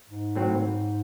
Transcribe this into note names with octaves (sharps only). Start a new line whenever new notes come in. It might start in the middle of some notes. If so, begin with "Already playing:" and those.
G#2
A2 F#3 C4